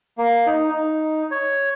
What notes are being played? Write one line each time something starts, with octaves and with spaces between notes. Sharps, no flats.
A#3
D#4
D#4
C#5